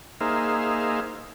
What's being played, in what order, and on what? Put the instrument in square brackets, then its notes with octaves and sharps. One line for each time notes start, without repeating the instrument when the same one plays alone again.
[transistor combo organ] A#3 D#4 G#4 C5 E5 F5